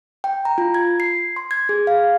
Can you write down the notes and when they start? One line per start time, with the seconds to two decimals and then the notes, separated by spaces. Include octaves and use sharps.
0.24 G5
0.45 A#5
0.58 F4
0.75 G#6
1.00 C7
1.36 C6
1.51 G#6
1.69 G#4
1.87 F5